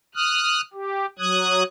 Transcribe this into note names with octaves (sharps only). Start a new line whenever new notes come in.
D#6 F6 F#6
G4
F#3 D#6 F#6 G#6